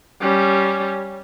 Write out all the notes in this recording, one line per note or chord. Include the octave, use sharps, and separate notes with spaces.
G3 C#4